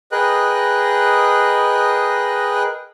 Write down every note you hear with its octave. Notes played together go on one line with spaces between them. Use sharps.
G#4 A#4 B4 D#5 G5 F#6